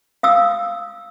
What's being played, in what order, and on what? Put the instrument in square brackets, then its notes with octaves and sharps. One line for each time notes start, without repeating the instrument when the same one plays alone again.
[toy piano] F5 D#6 E6